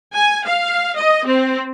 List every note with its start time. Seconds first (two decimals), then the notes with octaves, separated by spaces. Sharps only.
0.14 G#5
0.46 F5
0.97 D#5
1.26 C4